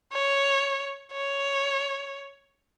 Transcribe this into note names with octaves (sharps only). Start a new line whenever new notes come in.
C#5
C#5